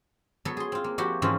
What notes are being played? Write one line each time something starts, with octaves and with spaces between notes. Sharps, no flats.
F#3 B3 A4
G#4 C6
C4 F4
A#3
F3 E4 F#4 G4
G#2 E3 F3 C4 C#4 F4